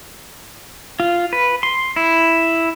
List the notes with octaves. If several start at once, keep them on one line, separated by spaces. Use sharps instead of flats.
F4
B4
C6
E4